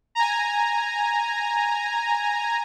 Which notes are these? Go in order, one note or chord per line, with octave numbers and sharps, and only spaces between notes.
G#5 A#5